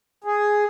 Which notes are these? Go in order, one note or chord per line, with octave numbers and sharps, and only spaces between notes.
G#4